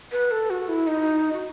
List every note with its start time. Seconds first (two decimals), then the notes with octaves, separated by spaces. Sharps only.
0.12 B4
0.31 A4
0.50 F#4
0.69 E4
0.87 D#4
1.33 F#4